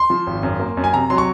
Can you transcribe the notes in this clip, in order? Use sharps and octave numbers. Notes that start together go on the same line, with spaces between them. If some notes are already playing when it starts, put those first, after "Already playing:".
Already playing: C6
F3
G#1
F#2
A#3
F#2
G#5
C3 A#5
F#3 C6
C#6